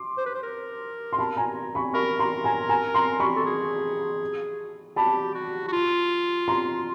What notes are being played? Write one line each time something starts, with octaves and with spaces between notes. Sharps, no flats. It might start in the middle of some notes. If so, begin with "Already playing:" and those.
Already playing: C6 D6
C5
B4
C5
A#4
C6
A5 B5
G#5 A#5
B5 C#6
A#4 B5 C#6
A#5 C6
G#5 A#5
G#5 A#5
A#5 C6
B5 C#6
A4
G#4
G4 A5 B5
F#4
F#4
F4
A#5 C6